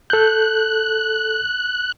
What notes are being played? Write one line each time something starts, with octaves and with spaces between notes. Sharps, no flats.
A4 F#6 G6